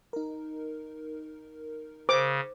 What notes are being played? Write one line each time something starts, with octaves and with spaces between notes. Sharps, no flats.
D#4 A#4
C#3 C5 D6